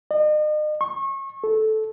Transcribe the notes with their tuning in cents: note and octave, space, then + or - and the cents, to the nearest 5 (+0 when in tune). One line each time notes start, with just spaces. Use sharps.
D#5 -40
C#6 -30
A4 -15